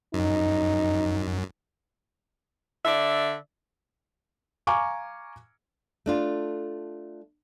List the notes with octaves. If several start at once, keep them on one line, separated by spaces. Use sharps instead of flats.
F#2 D#4
D3 D5 E5
F5 G#5 A#5 C#6 D6
A3 D4 F4